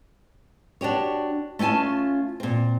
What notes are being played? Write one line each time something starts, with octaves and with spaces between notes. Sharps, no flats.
D4 F#4 G4 C#5
A3 C#4 F4 G#5 A5
A#2 C4